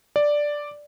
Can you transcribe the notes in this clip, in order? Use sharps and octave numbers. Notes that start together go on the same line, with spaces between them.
D5